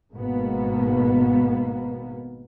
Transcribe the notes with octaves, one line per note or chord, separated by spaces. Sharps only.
G#1 G#2 B2 A#3 B3